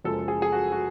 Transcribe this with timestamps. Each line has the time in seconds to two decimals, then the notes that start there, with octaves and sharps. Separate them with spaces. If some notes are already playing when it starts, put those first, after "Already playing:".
0.04 F#1 F#2 F3 G#3 A4
0.28 G#4
0.42 G#4
0.52 F#4
0.72 F#4